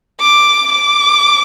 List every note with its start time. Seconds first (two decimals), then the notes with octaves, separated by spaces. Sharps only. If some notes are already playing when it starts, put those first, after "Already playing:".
0.20 D6
0.72 D6